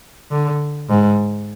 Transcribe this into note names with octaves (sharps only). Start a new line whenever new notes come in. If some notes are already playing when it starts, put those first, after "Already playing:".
D3
G#2